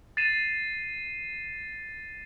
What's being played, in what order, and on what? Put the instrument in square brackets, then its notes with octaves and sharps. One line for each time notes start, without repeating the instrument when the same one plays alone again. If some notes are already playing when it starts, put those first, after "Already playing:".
[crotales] A6 C7 D#7 E7